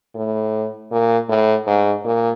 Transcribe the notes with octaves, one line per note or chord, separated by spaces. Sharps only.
A2
A#2
A2
G#2
A#2